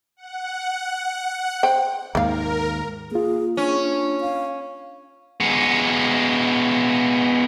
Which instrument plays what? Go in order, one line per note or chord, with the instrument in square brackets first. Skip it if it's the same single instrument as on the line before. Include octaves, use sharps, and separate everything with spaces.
[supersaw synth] F#5
[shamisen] C5 G5
[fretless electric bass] D#2 G#2 [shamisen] A#3 F5 [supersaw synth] A#4
[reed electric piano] A#3 F4 [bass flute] G#4
[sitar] C#4 [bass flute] D4
[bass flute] D4
F5
[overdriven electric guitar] G#3 B3